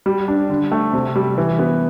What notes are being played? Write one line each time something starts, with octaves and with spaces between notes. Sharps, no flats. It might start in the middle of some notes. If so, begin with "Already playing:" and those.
G3
D4
D3
A3
C3
G3
E3
B3